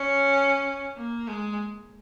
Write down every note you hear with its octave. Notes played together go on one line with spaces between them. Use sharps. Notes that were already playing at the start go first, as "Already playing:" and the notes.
Already playing: C#4
A#3
G#3